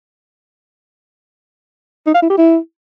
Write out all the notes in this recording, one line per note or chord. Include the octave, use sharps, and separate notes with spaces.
D#4
F5
E4
G4
E4